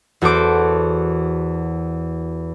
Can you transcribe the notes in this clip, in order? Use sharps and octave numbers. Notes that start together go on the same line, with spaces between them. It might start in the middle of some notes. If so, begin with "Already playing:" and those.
E2 F#4 A4 C5 D6